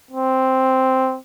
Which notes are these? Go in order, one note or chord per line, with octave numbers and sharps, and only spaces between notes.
C4